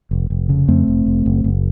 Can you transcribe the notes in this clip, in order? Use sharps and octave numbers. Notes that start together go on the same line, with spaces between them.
F1
F1
C#3
F2 A3 C4
F1
F1
F#1
F#1